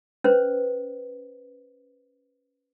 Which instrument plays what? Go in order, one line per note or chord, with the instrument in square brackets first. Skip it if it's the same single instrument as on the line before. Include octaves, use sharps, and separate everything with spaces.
[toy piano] C#4 B4 C5